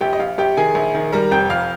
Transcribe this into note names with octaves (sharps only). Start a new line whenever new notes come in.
A#1 G4 G5
D#5
A#1 F5
A#1 G4 G5
D#3 G#4 G#5
A#1
D#3
G3 A#4 A#5
F1 G5 G6
F2 F5 F6